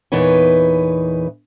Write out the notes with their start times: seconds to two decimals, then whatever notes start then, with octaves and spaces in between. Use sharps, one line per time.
0.12 E2 A#2 E3 D#4 B4 C#5